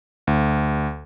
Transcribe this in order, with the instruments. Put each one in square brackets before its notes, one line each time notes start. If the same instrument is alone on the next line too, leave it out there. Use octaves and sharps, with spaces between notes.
[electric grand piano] D2